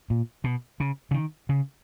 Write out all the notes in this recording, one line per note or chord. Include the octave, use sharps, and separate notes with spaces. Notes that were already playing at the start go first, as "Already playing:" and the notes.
A#2
B2
C#3
C#3
D#3
C#3